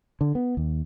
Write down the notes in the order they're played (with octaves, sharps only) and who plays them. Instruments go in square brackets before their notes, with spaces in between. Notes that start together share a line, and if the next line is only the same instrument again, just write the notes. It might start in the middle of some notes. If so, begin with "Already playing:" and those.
[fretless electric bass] D3
B3
D#2